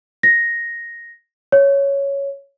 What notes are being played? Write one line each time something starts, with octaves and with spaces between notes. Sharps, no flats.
A#6
C#5